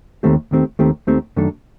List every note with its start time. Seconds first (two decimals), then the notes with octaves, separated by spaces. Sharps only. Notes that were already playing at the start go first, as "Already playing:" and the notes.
0.23 D#2 D#3 A3 C4 G4
0.51 D#2 D#3 A3 C4 G4
0.79 D#2 D#3 A3 C4 G4
1.07 D#2 D#3 A3 C4 G4
1.36 F#2 D#3 A3 D4 A4